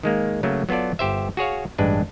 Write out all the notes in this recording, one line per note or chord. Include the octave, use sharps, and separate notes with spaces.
D#3 G#3 A#3
C#3 F#3 A3 A#3
F#3 B3 F4 A4 D5
G1 G4 C5 E5
F#4 G#4 C#5 F5
A1 G2 G#3 D4 B4